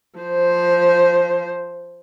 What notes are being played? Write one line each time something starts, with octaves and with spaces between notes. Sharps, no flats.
F3 C5